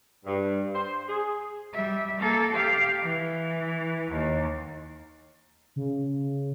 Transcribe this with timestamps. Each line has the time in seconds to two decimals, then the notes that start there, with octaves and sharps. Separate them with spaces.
0.25 G2
0.73 C5
1.08 G#4
1.74 G3 E5
2.19 A#3 A4
2.52 G4 F5
3.01 E3
4.11 D#2
5.76 C#3